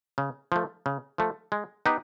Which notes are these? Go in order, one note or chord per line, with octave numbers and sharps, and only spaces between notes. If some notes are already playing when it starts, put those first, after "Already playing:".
C#3
F3 A3
C#3
F3 A3
G#3
B3 D#4 G4 B4